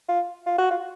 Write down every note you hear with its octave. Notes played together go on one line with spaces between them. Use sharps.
F4
F4
F#4
F4